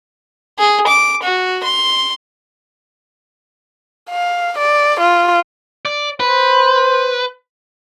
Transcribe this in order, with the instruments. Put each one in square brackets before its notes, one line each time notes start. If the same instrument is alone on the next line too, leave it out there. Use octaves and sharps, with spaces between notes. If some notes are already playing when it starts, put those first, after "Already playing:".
[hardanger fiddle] G#4
D6
F#4
C6
[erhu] F5
D5
F4
[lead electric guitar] D5
[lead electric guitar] B4 [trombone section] C5